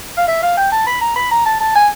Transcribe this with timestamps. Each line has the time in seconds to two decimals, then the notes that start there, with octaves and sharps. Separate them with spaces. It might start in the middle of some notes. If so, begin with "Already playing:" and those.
0.17 F5
0.28 E5
0.42 F5
0.57 G5
0.72 A5
0.87 B5
1.01 A#5
1.16 B5
1.31 A#5
1.45 A5
1.60 A5
1.75 G#5